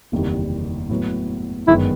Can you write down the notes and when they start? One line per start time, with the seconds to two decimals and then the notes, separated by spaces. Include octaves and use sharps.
0.12 F#1 E2 C3 D#3 G3
0.89 A2 F#3 B3
1.67 G1 F#2 D#3 G#3 B3 E4